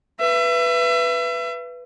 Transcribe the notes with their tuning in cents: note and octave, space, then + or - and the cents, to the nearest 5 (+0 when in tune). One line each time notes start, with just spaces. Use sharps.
B4 +0 E5 +35